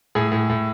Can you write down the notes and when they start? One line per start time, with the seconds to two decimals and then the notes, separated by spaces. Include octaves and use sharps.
0.15 A2 G#4 G#5
0.32 A2
0.50 A2